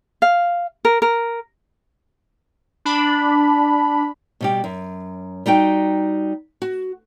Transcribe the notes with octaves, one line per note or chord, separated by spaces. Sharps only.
F5
A#4
A#4
D4 B5
B2 G3 G4
F#2
G3 D#4 F#4 G5
F#4